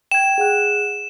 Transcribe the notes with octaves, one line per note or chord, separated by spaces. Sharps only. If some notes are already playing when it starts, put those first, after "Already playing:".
G5 G#6 E7
G#4 F#5 F#6